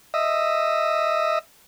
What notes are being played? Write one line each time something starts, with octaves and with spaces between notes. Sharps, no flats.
D#5 E5